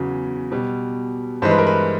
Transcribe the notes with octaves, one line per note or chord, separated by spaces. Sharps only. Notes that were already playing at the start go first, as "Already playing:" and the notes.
Already playing: E2 C#3 F#3
B2 G3
G2 E3 G#3 C5
B4
A#4
B4